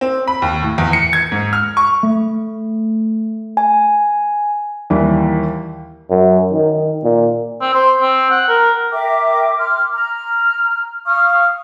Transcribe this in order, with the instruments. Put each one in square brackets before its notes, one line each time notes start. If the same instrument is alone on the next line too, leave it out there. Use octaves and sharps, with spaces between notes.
[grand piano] C4
B5
D#2
A2
E2
C#7
G#6
G#2
F6
C#6
[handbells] A3
G#5
[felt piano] D#2 E3 G3
[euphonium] F#2
D#3
A#2
[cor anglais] C4
C5
C4
F#5
A#4
[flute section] A#4 E5 G5 D6
C6 D6 F6
A#5 F6
F5 C#6 D#6 F6